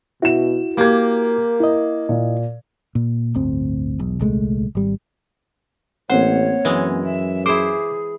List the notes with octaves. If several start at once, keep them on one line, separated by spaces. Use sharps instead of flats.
B2 E4 F#4 E5 E7
A#3 G4 A#4 G#6
E4 D#5
A#2
A#2
D1 G1 D2 C4
E1 B1
D#1 C2 G#3 A3
G#1 G3
A1 A#3 C4 C5 C#5 F#5
F#2 E3 G#3
E5
E4 G#4 C5 D6